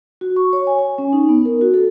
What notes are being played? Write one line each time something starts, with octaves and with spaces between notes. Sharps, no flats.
F#4
C#6
C#5
G#5
G#5
C#4
D#4
B3
A#4
F#4
A4